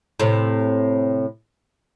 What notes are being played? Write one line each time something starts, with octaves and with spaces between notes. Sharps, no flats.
A2 C3